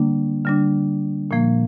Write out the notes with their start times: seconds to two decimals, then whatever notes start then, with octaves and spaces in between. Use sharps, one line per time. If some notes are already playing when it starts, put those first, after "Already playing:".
Already playing: D3 G3 A#3 D4
0.45 D3 G3 D4
1.31 A#2 F3 A#3